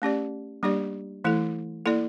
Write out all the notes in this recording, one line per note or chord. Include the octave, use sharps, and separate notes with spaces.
A3 C#4 G4 D5
G3 A#3 D4 G4 D5
E3 A3 E4 A4
A#3 E4 A4 D5